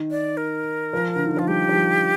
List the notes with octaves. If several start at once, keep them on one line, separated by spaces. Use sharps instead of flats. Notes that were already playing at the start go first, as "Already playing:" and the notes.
Already playing: D#3
D5
A#4
F3
D3
D#3
F3 F4
G3 G4
F3
G3